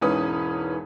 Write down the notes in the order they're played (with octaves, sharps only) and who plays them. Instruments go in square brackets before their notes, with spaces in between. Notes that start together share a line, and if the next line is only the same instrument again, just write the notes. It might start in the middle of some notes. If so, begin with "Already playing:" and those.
[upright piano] E1 G#2 E3 C#4 B4 D#6